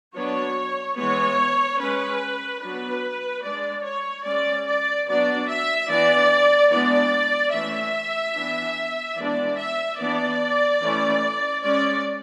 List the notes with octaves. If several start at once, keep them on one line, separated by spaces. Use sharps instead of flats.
F#3 B3 D4 C#5
E3 G#3 B3 C#5
G#3 C#4 B4
F#3 B3 D4 B4
G#3 D4 D5
C#5
G#3 C#4 D5
D5
F#3 B3 D4 D5
E5
E3 B3 D4 D5
E3 G#3 B3 D4 D5
E3 A3 C#4 E5
E3 B3 D4
E3 G#3 B3 D4 D5
E5
E3 B3 D4 D5
E3 A3 C#4
G#3 C#4 D5